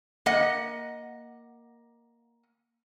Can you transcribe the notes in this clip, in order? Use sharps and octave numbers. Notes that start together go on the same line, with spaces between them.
A#3 D#5 F#5